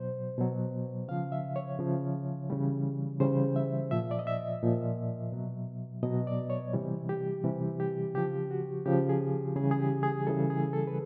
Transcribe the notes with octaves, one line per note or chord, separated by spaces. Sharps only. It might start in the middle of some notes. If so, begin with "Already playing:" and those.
Already playing: B2 F#3 C5
B2 F#3
C#3 F3 F5
E5
C#5
C#3 F3
C#3 E3 G3
C#3 E3 G3 C5
E5
A#2 F3 E5
D5
D#5
E5
A#2 F3
B2 F#3
B2 F#3 D#5
D5
C#5
C3 E3 G3
G4
C3 E3 G3
G4
C#3 F3 G4
F#4
C#3 F3 G4
G#4
C#3 E3 G3 G#4
G#4
G4
G#4
C#3 E3 G3 A4
G#4
A4
B4